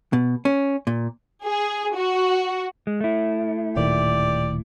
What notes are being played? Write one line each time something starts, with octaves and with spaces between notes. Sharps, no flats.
B2
C#4
A#2
G#4
F#4
G#3
A3 E4
D1 A#2 D#3 G4 D5